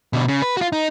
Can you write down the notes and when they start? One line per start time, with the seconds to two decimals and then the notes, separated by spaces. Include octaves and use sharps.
0.13 B2 D3
0.28 C#3
0.42 B4
0.57 F4 F#4
0.73 D#4